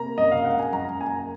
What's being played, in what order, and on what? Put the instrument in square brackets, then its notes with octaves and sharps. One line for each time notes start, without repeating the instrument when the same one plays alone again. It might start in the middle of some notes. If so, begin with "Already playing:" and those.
Already playing: [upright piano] C3 A#3 A#5
F#2 D#5
F5
G#3 F#5
G#5
F#2 A#5
A#3 G#5